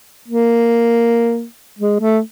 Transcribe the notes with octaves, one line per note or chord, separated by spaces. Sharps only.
A#3
G#3
A3